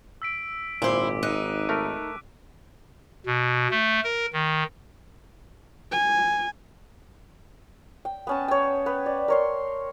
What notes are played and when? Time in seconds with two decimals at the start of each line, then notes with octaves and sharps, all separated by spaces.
0.22 E6 B6 D7
0.82 G#1 A#2 E4 C5 D6
1.23 D#4 F#6 D#7
1.69 A3 A#4
3.26 B2
3.71 A3
4.04 A#4
4.33 D#3
5.92 G#5
8.05 G5
8.27 B3 C#4 A5
8.48 C#5 G5
8.86 B3 B4
9.06 D5
9.28 A#4 C#5 C6